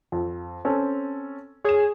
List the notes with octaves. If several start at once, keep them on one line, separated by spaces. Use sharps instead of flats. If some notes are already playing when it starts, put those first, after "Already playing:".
F2
C4 C#4 A4
G#4 C#5 E7